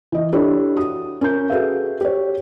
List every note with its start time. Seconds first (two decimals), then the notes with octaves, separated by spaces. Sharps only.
0.12 E3 D#5
0.33 D4 E4 G4 A4 C#5
0.76 F#4 D#6
1.21 C#4 A#4 G6
1.50 F#4 G#4 A4 B4 E5 F5
2.01 G4 C#5